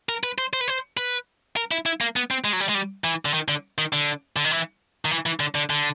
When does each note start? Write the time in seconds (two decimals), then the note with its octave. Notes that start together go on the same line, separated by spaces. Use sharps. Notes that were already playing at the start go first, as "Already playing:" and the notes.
0.09 A#4
0.23 B4
0.38 C5
0.53 C5
0.61 B4
0.68 C5
0.97 B4
1.57 A#4
1.71 E4
1.86 E4
2.01 A#3
2.16 B3
2.31 C4
2.44 G#3
2.53 F#3
2.60 G3
2.69 G#3
2.74 G3
3.04 E3
3.25 D3
3.34 D#3
3.48 D3
3.78 D#3
3.93 D3
4.36 D3
4.44 D#3
4.51 E3
5.05 D#3
5.11 E3
5.26 E3
5.40 D3
5.55 D3
5.70 D3